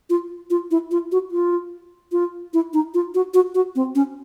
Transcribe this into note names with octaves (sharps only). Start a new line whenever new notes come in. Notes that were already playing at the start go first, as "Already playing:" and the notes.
F4
F4
E4
F4
F#4
F4
F4
E4
D#4
F4
F#4
F#4
F#4
C4
C#4